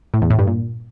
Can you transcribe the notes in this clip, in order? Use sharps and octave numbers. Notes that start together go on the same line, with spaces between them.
A2
E2
A2
G2
A#2